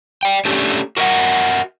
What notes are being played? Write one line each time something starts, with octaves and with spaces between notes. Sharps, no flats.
D5 G5
A3 C#4 D4 G4 A4
F#4 A#4 D#5 E5 F#5